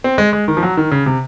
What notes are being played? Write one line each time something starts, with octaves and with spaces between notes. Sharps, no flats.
C4
G#3
G#3
D#3
F3
F#3
D#3
C#3
C3